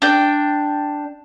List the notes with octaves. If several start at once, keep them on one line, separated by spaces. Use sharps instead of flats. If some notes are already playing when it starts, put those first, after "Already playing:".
D4 G5